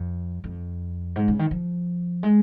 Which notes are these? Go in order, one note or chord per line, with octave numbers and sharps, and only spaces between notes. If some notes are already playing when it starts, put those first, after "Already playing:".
Already playing: F2
F2
G#2
C#3
D#3
F3
G#3